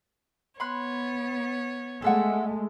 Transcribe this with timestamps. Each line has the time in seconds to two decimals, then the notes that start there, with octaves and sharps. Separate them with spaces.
0.60 B3 C#5 B5 C6 F#6
2.02 G#3 A3 A4 E5 F#5